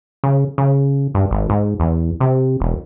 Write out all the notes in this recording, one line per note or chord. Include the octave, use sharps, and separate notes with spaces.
C#3
C#3
G2
G#1
G#2
E2
C3
E1